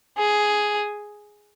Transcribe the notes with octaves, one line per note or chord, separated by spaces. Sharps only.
G#4